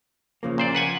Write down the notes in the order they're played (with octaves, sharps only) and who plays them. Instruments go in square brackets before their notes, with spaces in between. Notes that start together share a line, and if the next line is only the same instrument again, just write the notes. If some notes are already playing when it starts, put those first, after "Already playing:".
[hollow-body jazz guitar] C#3 F3 A#3
[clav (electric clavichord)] A#2 C5 D5
B4 F#5 G#5